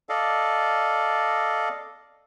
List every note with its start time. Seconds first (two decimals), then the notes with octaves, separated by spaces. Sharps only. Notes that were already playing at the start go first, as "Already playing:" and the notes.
0.09 A4 D5 D#5 F5